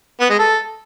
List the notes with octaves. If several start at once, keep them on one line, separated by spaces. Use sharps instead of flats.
B3
G#3
A4